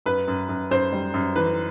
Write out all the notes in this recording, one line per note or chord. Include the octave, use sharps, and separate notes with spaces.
F#2 B4
F#2
F#2
F#2 C5
G3
F#2
E3 B4